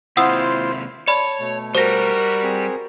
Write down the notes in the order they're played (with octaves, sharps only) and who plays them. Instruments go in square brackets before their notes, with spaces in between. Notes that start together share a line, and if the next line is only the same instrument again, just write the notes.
[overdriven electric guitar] D#2 C3 [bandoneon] E4 F4 C5 [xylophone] F#5 D#6 E6
[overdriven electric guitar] C#5 [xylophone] D5 B5 [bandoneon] A5
[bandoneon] B2 A3
[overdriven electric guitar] G3 [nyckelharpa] F#4 A#4 [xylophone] C5 A#6
[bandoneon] C4 G#4